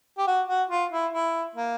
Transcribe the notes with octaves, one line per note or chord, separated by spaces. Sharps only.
G4
F#4
F#4
F4
E4
E4
A#3